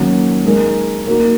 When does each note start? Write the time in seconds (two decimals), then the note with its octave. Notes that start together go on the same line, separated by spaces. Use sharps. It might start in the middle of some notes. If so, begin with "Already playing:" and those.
Already playing: D#3 F#3 A#3 C#4
0.45 G#3 D#4 A#4
1.07 A#3 D#4 F#4 A#4